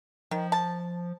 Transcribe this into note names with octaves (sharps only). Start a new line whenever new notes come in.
D#3 F3
A5